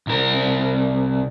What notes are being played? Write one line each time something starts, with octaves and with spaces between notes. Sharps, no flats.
C2 A#4